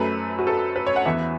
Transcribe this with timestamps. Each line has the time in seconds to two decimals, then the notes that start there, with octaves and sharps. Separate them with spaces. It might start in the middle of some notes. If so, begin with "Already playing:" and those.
Already playing: F#2 F#3 A3 B4
0.39 F#4
0.47 A4
0.76 B4
0.87 C#5
0.96 F#5
1.05 E2 E3 B3 E5